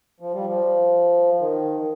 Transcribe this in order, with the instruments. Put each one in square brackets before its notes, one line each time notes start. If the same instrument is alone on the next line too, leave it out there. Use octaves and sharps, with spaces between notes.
[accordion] F3
G3
F3
D#3